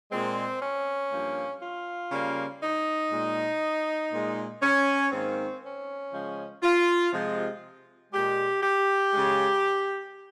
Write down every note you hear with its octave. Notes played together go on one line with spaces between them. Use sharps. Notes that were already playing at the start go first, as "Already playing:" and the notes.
A#2 G#3 C4
C#4
G2 F3 A#3
F4
C#3 G3 A#3
D#4
A#2 G#3
A#2 G#3
C#4
G#2 D#3 A#3 C4
C#4
C#3 F3 G#3
F4
C3 F3 G#3
A#2 G#3 G4
G4
C#3 G#3